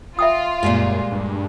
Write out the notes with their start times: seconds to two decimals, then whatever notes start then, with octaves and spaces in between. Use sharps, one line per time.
0.19 F4 E5 G5 D#6
0.63 F#2 A#2 G3 G#3
1.12 G2